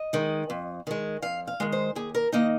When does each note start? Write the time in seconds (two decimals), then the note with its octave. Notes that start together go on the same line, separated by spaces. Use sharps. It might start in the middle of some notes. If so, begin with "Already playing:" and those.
Already playing: D#5
0.13 D#3 G#3
0.50 F2
0.87 D#3 G#3
1.22 F2 F5
1.47 F5
1.60 D#3 G#3
1.72 C5
1.95 D#2 G#4
2.15 A#4
2.32 D#3 A#3 D#4 D#5